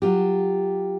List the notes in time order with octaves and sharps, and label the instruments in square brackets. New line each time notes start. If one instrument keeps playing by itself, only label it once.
[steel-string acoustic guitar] F#3 F4 G4